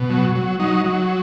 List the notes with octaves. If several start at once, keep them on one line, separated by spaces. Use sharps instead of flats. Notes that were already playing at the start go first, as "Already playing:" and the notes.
Already playing: B2
F#3
F#3
F#3 D#4
F#3